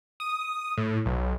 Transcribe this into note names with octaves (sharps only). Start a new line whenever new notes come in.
D#6
A2
B1